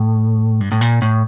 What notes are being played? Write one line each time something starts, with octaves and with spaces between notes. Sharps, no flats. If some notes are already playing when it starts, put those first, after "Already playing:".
Already playing: A2
G2
A2
A#2
A2